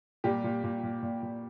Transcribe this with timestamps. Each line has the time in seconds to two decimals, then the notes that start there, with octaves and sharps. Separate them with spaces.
0.24 A#2 G3 G4
0.44 A#2
0.64 A#2
0.83 A#2
1.03 A#2
1.23 A#2